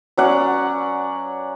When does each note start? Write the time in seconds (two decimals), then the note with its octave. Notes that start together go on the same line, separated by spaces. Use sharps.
0.17 F#3 C#4 D5 F#5